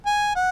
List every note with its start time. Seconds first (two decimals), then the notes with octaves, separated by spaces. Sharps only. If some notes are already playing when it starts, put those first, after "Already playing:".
0.06 G#5
0.36 F#5